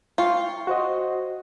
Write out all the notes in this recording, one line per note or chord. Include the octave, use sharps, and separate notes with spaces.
F4 G5 C6 C#6
F#4 C5 D#5